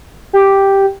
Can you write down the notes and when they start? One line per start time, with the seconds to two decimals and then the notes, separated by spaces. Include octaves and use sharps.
0.33 G4